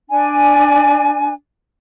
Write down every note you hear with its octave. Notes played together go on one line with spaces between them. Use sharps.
D4 G#5